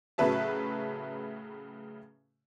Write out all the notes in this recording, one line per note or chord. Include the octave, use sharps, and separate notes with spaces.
A2 C#3 F#3 B4 E5 A5